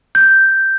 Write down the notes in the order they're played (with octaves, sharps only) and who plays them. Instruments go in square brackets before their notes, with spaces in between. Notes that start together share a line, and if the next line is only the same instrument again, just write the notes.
[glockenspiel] G6